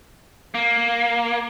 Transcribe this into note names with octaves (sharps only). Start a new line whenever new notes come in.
A#3